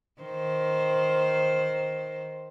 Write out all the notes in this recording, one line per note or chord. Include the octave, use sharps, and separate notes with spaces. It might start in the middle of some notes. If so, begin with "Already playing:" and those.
D#3 C5